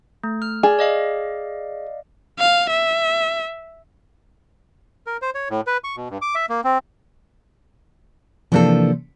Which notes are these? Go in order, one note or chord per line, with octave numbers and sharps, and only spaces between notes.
A3
F6
G#4 D5
D5 D#5 F5
F5
E5
A#4
C5
C#5
A2
B4
C#6
B2
G2
D6
E5
A#3
C4
C3 E3 F3 A#3 D4 A4